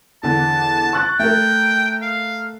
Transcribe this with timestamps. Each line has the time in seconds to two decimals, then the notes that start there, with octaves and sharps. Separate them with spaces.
0.23 E2 D3 A5
0.93 C#6 F#6 A6
1.19 A3 A#4 G5
2.02 F5